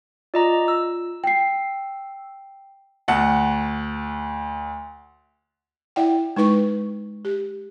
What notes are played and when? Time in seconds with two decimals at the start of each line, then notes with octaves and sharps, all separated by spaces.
0.34 F4 D5 D#5 A#5
0.68 E6
1.24 G5 C7
3.08 D2 F#5 A5
5.96 E4 D5 E5 F#5 G5
6.36 G#3 D#4 B4 C#6
7.25 G4